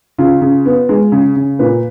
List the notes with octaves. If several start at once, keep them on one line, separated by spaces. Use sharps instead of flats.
C#3 F4
C#3
B3
G#3
C#3
C#3
A#2 B4